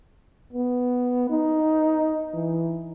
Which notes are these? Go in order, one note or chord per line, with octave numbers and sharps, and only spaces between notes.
B3
D#4
E3